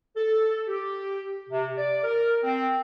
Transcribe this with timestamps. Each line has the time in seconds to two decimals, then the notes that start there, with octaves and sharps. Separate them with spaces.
0.17 A4
0.68 G4
1.50 C3
1.78 D5
2.04 A#4
2.44 C4